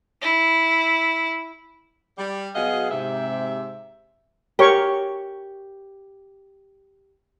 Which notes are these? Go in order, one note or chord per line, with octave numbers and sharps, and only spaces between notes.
E4
G3
B2 F#3 G#4 D#5 F5 F#5
G#2 C3 E5
G4 A#4 C#5 C#6